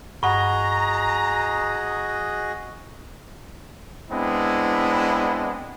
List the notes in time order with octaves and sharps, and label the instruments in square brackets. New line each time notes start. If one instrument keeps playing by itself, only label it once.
[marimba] G2 F#5 [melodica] F#4 G#4 D#5 [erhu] A#5 [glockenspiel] C#6
[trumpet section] G#3 B3 C4 D4 E4